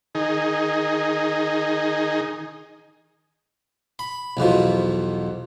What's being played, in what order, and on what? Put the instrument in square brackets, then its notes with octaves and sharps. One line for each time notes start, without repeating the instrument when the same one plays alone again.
[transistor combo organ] D#3 D#4 G#4
[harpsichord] B5
B1 E2 B2 F3